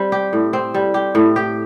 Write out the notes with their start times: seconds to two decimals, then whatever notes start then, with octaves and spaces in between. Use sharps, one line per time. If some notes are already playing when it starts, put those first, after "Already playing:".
Already playing: G3 C4
0.12 G4
0.33 A2
0.53 C4
0.74 G3
0.94 G4
1.15 A2
1.36 G4